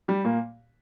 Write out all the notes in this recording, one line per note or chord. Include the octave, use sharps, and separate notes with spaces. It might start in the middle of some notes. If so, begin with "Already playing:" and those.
G3 G4
A#2 A#3